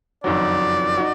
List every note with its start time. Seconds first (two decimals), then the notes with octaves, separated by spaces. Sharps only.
0.24 F#1 F2 D#3 F#3 D5
0.97 D#4 F#4